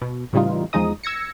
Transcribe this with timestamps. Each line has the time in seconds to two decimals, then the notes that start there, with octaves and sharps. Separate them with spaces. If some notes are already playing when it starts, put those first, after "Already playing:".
0.02 B2
0.33 A2 C#3 E3 G3 D#4 F4
0.73 E2 F3 G#3 D#4 D#5 D#6
1.03 E6 G#6 A#6 C#7